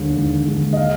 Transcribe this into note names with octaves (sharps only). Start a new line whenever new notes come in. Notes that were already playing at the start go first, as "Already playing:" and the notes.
Already playing: D#2 D3 G#3
D#2
D3 G#3
D#5
F5